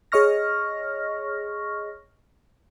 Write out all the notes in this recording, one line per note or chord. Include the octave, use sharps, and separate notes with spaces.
G#4 C#5 D#5 C#6 F6 A#6